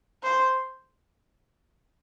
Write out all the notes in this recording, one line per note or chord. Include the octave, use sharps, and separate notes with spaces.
C5